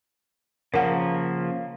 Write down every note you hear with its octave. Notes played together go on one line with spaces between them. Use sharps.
C#3 F3 A#3 A#4 F#5